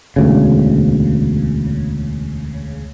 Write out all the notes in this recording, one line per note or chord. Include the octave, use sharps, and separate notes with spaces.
E1 D2 C#3